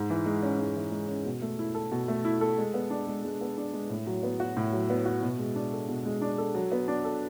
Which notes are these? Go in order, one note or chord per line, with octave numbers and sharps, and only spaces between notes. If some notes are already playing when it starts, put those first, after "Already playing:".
Already playing: G#2
E3
G#3
C#4
G#2
E3
G#3
C#4
B2
A3
E4
A4
B2
A3
E4
A4
G#3
B3
D4
G#3
G#3
B3
D4
G#3
A2
F#3
B3
F#4
A2
F#3
B3
F#4
B2
G#3
D4
A4
B2
G#3
D4
A4
F#3
B3
D4
A4